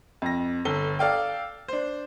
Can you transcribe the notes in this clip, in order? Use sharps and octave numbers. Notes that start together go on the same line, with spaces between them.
F2 A#6
G1 A4 G7
A4 D5 F5 G5
D4 C5